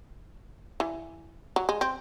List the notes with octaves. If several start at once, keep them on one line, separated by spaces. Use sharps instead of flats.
E3
F#3
G#3
C4